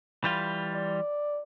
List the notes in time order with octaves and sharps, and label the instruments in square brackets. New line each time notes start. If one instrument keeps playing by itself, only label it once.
[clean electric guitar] E3 G3 F4
[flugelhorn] D5